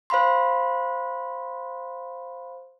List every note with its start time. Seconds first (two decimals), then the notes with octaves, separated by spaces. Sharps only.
0.10 C5 F5 B5 C6